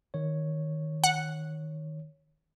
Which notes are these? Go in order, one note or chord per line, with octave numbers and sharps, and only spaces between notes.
D#3 C#5
F#5